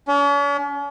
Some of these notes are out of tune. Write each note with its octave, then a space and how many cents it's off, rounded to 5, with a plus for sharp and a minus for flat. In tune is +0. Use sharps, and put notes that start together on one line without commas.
C#4 +45